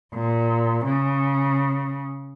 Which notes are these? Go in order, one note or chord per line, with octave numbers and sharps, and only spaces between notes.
A#2
C#3